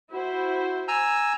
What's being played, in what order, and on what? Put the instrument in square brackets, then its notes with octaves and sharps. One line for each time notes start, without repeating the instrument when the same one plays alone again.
[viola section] E4 C5 [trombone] F#4
[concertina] G#5 A#5 E6